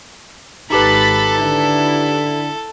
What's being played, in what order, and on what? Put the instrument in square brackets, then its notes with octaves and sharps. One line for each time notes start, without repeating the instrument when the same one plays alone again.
[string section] G#1 B5 A6 [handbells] D#4 G4 B4 [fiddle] A4
[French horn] D3 [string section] E4